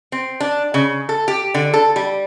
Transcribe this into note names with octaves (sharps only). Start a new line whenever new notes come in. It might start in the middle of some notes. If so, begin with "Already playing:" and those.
C4
D4
C#3
A4
G4
D3
A4
G3